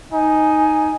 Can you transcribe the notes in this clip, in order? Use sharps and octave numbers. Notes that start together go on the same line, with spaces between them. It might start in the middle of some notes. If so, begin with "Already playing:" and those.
D#4 G#5